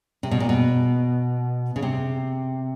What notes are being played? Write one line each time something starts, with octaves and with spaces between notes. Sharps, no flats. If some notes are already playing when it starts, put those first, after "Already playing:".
C3
B2
A#2
B2
C#3
C3